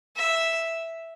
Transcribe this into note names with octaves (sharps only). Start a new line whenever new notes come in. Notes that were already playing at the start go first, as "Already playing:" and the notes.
E5